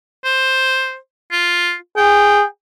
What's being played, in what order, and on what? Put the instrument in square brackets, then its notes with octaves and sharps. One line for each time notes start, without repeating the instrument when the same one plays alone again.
[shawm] C5
F4
[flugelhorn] G#4 [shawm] G5